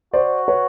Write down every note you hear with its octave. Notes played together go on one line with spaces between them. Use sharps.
F#4 C5 D5
B4 C#5